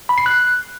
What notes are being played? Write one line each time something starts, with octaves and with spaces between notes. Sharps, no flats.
B5
C7
F#6